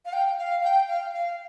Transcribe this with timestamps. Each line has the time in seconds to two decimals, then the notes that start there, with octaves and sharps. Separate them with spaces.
0.06 F5
0.13 G5
0.38 F5
0.63 G5
0.88 F5
1.14 F5